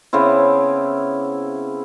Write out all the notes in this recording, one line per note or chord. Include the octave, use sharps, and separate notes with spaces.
C#3 B3 C4 E4